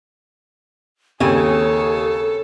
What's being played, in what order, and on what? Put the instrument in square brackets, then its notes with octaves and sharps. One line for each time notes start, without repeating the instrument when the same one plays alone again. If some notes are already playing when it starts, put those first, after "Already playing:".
[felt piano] D#2 [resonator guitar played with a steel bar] C#3 C4 G#5 [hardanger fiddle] G#4 C#5 [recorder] A4